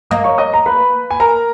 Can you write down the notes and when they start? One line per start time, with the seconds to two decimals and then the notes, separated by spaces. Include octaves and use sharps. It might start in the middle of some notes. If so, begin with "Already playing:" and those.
0.11 A#3 D#5 D#6
0.24 C#5 C#6
0.38 D#5 D#6
0.54 A#5
0.66 B4 B5
1.11 G#5
1.20 A#4 A#5